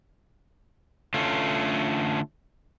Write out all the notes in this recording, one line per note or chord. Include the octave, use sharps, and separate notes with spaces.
D3 A3 C#4 F4